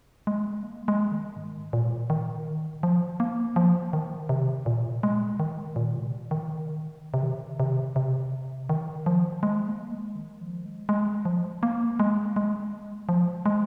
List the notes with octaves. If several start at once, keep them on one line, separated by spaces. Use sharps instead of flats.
G#3
A#3
G#3
D#3
G#2
A#2
D#3
F3
A#3
F3
D#3
C3
A#2
G#3
D#3
A#2
C3
D#3
D#3
C3
D#3
C3
C3
D#3
F3
G#3
A#3
G#3
D#3
F3
G#3
G#3
F3
A#3
G#3
G#3
F3
G#3